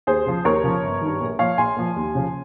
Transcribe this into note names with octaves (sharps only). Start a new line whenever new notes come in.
D#2 G#4 C5
C#3 F3
D#2 A#4 C#5
C#3 F3
G1
G2 D#3
A#1
A#2 F3 C#5 F5
A#1 G#5 C6
A#2 F3
D#2
C#3 F3